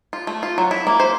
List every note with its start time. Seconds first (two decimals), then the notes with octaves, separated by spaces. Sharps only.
0.13 F4
0.27 A3
0.43 F4
0.58 F#3
0.71 E4
0.87 A#3
1.00 C5